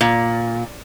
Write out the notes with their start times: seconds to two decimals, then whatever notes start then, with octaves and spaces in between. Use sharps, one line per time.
0.01 A#2